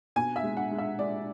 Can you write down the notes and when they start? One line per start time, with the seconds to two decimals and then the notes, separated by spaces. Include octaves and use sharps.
0.16 B2 G#5
0.36 E5
0.43 G#3
0.57 F#5
0.71 G#3
0.78 E5
0.99 G#3 D5